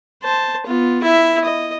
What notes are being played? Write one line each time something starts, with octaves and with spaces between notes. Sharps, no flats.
C5 A5
B3 F4
E4 E5
D#5